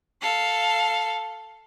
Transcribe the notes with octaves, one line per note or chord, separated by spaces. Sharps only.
A4 F5